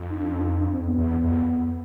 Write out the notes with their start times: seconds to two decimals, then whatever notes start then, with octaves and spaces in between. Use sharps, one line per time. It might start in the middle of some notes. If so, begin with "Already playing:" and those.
Already playing: F2
0.10 D#4
0.19 D4
0.30 C#4
0.38 D4
0.45 D#4
0.58 D4
0.71 C4
0.85 B3
0.98 E2
1.24 F2